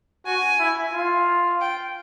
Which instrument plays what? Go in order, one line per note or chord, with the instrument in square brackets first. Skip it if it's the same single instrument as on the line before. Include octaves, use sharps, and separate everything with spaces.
[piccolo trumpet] F#4 [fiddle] G#5
[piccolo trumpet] E4
F4
[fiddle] G5